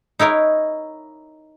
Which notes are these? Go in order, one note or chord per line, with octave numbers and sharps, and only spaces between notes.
D#4 E4 A#4 C#5